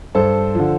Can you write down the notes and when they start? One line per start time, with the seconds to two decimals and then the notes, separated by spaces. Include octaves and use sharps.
0.15 G2 A4 C5
0.55 D3 F3